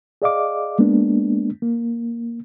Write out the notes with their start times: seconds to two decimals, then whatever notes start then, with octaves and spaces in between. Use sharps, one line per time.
0.22 G#4 D5 D#5 F5 D6
0.79 G#3 A#3 B3 D4
1.62 A#3